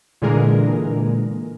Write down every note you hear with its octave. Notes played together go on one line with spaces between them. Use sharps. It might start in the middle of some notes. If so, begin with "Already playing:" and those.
A#2 D3 E3 G#3 G#4 A#4